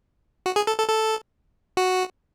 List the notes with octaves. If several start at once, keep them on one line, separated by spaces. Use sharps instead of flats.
F#4
G#4
A4
A4
A4
F#4